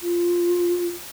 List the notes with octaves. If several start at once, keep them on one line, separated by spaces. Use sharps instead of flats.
F4